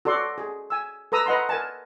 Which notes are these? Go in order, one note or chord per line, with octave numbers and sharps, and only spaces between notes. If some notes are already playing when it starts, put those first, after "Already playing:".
F#4 A4 D5 C6
G#4
G#5 E6
A4 B4 A#5 D#6 E6
B4 D#5 F#5 A#5 C6
A#4 G#5 A5